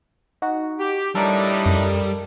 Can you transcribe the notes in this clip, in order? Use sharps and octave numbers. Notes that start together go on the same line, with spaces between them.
D#4 F#4
G4
A2 G3 D4 D#4 A4 A#4 D5
F#2